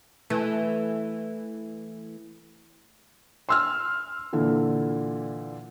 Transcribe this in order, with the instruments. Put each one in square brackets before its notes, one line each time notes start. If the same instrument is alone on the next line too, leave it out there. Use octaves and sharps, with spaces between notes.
[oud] E3 [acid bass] A3
[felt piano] C6 E6 F6
A#2 D3 E3